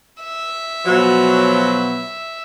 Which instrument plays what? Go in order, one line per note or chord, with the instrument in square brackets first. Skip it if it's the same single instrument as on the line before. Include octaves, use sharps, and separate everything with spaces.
[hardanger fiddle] E5
[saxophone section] B2 F3 F#3